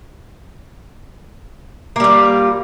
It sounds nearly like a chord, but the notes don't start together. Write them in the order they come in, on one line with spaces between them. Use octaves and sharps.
A#3 G3 F4